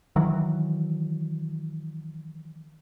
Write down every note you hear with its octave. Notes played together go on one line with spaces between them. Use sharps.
D#3 E3 F#3